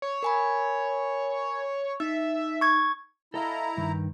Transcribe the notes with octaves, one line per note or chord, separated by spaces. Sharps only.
C#5
A#4 G#5 B5
D#4 E5
C#6 G#6
E4 A4 D#5 F5 A#5
G2 D#3